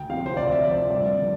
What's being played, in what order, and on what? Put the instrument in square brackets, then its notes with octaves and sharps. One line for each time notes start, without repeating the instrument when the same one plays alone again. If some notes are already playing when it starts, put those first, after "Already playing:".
Already playing: [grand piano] D2 G5
C3 F3 F5
C5
D2 D5
E5
C3 F3 D5
G2 D5
D3 F3